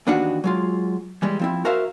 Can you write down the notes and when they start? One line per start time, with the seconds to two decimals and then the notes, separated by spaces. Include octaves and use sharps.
0.07 D#2 E3 D4 D#4 F#4 F#5
0.44 F#3 G#3 F4
1.22 E3 G3 G#3
1.39 F3 C4 E4
1.65 F#4 A#4 C5 E5 F5